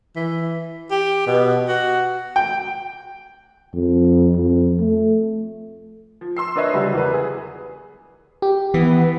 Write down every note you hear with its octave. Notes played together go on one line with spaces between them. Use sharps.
E3
G4
B2
F#4
G5
F2
F2
A3
F3
C6 E6 C7
D4 A#4 B4 C#5 D#5 E5
C#3 F#3 G3 F#4
E2 A#4 B4
G#4
G4
E3 B3